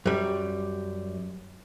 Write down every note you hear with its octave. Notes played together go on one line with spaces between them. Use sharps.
F#2 G3